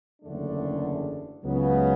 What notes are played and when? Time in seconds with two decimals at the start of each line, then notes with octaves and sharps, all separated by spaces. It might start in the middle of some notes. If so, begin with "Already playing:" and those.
0.22 F#1 E2 D3 A3 D4
1.43 C#2 C#3 F#3 B3